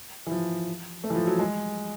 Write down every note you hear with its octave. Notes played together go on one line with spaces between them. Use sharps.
E3
F3
A3
E3
F3
F#3
G#3